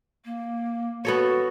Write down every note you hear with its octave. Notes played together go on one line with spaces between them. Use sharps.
A#3
B3 F#4 A4 C#5